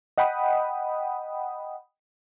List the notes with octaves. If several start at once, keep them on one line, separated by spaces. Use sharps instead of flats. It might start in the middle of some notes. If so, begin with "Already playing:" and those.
D#5 F#5 G5 B5 D#6